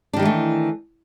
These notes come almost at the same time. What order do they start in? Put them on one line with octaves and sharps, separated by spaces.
D4 D#3 G3 E3 A3